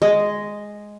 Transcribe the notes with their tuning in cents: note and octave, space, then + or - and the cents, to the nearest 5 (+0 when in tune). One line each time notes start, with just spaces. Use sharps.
G#3 +0 D#5 +0